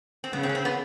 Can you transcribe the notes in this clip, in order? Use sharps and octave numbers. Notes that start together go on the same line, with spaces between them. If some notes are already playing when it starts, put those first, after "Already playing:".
C4
C#3 B3
C4
C#4
C4
B3